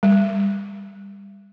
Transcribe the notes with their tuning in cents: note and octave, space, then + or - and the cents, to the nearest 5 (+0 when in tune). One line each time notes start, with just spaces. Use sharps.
G3 +25